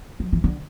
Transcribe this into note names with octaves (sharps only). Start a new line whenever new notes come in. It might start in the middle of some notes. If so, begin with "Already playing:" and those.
F#3
E3
D3